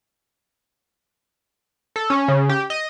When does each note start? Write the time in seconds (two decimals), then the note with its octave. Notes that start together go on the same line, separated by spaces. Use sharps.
1.96 A4
2.10 C#4
2.28 C#3
2.49 G4
2.70 D#5